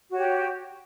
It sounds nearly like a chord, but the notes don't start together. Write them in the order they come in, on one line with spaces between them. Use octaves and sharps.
F#4 C#5 G4